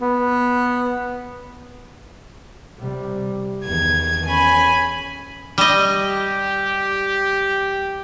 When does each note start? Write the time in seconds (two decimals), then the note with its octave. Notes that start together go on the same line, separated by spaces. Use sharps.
0.01 B3
2.79 C3 G3
3.65 E2 D#3 G#6
4.27 C#4 G#5 B5
5.58 G3 D#5
5.92 G4